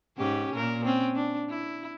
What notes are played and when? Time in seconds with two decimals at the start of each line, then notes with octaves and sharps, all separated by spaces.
0.18 G#2 C#4 G4
0.54 A#2 A#4
0.85 C4 C#4
1.15 D4
1.49 E4